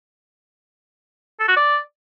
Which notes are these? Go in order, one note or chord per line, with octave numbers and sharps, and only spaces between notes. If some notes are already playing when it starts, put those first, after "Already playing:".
A4
F#4
D5